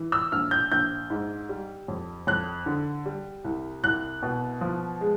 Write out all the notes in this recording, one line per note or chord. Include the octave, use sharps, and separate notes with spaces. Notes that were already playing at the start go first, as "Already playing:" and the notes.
Already playing: E3
E6
A#1 F6
G6
A#1 G6
G#2
G3
F2
F2 F#6
D3
G3
C2
C2 F#6
B2
F3
G#3